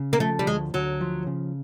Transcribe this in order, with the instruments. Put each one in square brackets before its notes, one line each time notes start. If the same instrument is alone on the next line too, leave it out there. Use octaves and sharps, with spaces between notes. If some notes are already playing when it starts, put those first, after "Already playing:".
Already playing: [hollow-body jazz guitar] C#3
[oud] A#3
[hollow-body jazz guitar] F3 [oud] A3
[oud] G3
[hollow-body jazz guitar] D2 [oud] G#3
[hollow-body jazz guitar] D2 [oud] F#3
[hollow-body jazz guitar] F3
C#3